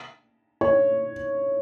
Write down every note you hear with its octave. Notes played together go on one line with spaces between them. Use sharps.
C#5